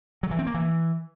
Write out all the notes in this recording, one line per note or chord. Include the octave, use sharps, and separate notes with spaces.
F#3
E3
C4
A#3
E3